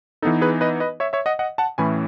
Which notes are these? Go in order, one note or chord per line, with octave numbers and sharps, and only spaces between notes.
E3 B3 D#4 A4
G#4 B4
B4 D#5
B4 D#5
C#5 E5
C#5 E5
D#5 F#5
D#5 F#5
F#5 A5
A2 E3 A3 C#4 G#5 B5